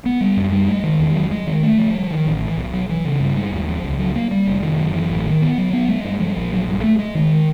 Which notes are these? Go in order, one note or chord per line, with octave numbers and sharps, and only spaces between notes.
B3
G3
F#2
G3
G#3
D#3
E2
F#3
G#3
D#3
A3
F3
G3
D#3
A1
E3
B1
F#3
E3
C#3
G2
G#3
D#2
F3
C#2
F#3
A#3
G3
F1
D#3
F#2
E3
A1
D#3
B3
F#3
B3
G#3
G2
F3
A#1
F#3
G2
A3
G#3
D#3